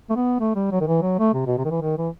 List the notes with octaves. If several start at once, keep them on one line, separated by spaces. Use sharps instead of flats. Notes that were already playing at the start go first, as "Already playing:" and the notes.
A3
B3
A3
G3
F#3
D#3
E3
F#3
A3
C3
B2
C3
D#3
E3
D#3
E3